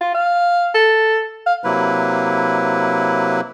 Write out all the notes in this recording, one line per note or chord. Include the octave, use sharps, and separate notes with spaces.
F4
F5
A4
F5
C3 F#3 A#3 E4 B4